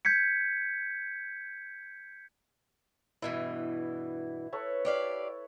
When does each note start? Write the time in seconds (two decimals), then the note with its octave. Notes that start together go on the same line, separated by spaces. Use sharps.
0.05 G6 G#6 B6 C#7
3.22 G2 B2 E3 E4
4.52 A4 B4 C#5
4.85 G4 D5 F5